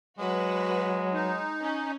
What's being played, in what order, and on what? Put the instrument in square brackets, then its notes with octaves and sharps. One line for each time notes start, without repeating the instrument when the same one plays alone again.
[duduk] F#3 [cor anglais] G#3 [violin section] F#4 B4
[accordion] D#4
[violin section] C#4